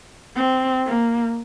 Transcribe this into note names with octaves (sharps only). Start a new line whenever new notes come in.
C4
A#3